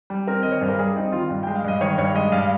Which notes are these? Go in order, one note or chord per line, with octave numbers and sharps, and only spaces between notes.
G3
C4 A#4
D#3 D#5
C#5
G2 C5
A#4
G3 G#4
C4 D#4
D#3 F4
G2
G#3 G5
F5
G2 D#5
D#3 C#5
G2 C#5
G#3 D#5
G2 F5